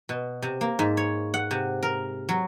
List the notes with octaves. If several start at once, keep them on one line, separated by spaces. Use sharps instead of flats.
B2
C3
A#3
G#2
C#5
F#5
C3
A#4
F#3